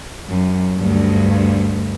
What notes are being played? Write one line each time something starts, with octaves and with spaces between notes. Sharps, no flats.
F#2
D2 G2